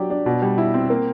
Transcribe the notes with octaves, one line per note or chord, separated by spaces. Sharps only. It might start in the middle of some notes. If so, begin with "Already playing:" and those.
Already playing: F#3 D4 G4
D4
B2
G3
E4
C4
A#3